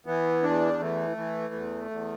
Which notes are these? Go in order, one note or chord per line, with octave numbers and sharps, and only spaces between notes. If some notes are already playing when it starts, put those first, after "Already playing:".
E3 B3
E2 D4
E3 A3
E3
E2
E2